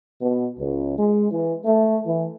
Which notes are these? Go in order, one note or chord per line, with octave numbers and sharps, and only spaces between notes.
B2
C#2
G#3
E3
A3
E3